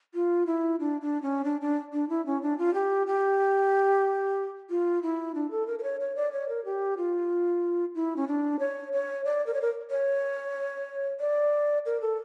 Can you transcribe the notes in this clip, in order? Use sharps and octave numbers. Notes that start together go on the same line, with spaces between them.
F4
E4
D4
D4
C#4
D4
D4
D4
E4
C#4
D4
F4
G4
G4
F4
E4
D4
A4
A#4
A#4
C#5
C#5
D5
C#5
A#4
G4
F4
E4
C#4
D4
C#5
C#5
D5
A#4
C#5
A#4
C#5
D5
A#4
A4